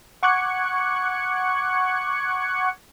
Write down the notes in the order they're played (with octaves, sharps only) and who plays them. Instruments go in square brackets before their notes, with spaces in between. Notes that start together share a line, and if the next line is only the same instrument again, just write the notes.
[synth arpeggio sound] F#5 C#6 D6 F#6 G#6 C#7